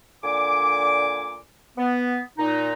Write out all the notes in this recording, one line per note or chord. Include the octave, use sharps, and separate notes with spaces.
A#2 D3 G#5 D6
B3
A#2 D#4